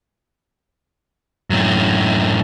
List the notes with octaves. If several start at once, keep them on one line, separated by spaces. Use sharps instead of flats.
F#2 A2